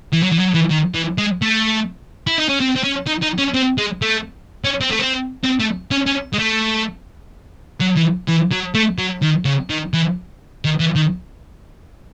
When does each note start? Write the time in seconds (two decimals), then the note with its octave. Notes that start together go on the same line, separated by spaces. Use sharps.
0.13 E3
0.23 F#3
0.32 E3
0.39 F#3
0.55 E3
0.71 D#3
0.95 E3
1.18 G#3
1.42 A3
2.27 E4
2.38 D#4
2.49 C#4
2.60 C4
2.76 C4
2.84 C#4
3.07 D#4
3.23 D#4
3.38 C#4
3.54 C4
3.78 G#3
4.02 A3
4.65 C#4
4.81 C4
4.91 A3
4.99 C4
5.44 C4
5.60 A3
5.91 C#4
6.07 C#4
6.34 G#3
6.39 A3
7.80 F#3
7.96 E3
8.28 E3
8.52 F#3
8.75 A3
8.99 F#3
9.22 D#3
9.46 C#3
9.70 D#3
9.94 E3
10.65 D#3
10.80 E3
10.96 D#3